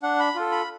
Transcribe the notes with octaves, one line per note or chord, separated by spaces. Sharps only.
D4 F#5
B5
F4 A4
B5